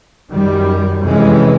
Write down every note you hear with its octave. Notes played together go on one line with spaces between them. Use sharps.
F#2 D#3 G3
F2 C3 E3 G#3 C#4